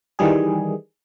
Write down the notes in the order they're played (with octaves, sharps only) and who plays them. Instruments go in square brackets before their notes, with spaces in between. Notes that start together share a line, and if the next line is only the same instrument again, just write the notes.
[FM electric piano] D#3 E3 G3 G#4